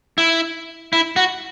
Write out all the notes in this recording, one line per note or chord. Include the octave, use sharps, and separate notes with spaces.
E4
E4
F#4